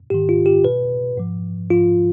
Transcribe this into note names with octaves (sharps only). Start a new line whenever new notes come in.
G#2 D#3 G4
F4
G4
B2 B4
G#2 F3
G#2 F3 F4